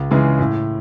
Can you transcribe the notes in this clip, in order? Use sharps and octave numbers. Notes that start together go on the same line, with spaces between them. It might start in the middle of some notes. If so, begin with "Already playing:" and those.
Already playing: C#2
C#3 E3 G#3
A2